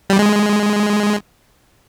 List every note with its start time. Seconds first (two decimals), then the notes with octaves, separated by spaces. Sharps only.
0.10 G3
0.19 G#3